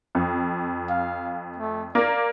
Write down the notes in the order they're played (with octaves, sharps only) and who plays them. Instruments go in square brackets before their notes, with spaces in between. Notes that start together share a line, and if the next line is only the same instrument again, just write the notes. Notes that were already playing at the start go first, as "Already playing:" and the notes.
[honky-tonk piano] F2
[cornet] F5
A3
[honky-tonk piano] A#3 [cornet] D5